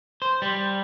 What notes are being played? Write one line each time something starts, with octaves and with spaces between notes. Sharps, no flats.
C5
G3